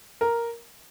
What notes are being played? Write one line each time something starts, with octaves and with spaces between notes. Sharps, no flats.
A#4